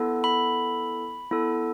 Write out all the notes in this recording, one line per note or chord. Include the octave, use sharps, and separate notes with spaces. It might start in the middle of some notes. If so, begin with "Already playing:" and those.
Already playing: B3 E4 A4
B5
B3 E4 A4